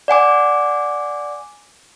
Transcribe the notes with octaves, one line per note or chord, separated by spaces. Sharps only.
D5 F#5 G#5 D6